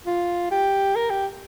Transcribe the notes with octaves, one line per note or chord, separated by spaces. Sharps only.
F4
G4
A#4
G4